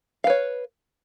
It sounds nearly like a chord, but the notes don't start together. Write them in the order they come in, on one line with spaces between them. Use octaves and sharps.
F5 B4 C#5